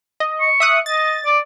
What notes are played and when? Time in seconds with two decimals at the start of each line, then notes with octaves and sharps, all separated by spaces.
0.20 D#5
0.41 C#6
0.60 E5 D#6 F#6
0.86 D#5 A6
1.26 D5